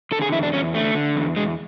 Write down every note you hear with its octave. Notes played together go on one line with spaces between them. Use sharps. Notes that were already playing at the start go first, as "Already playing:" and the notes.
D3 A4
G#4
E2 E4
D4
E2 C#4
D3 A3
D3
E2
E2 G#3